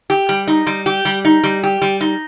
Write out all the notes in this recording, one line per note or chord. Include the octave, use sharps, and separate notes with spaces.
G4
G3
D#4
G3
G4
G3
D#4
G3
G4
G3
D#4